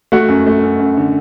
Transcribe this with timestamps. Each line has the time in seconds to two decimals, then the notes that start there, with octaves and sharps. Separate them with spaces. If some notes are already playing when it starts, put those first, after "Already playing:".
0.12 A3 F#4 F#5
0.29 F#2
0.46 A3
0.63 F#2
0.79 F#2
0.97 D3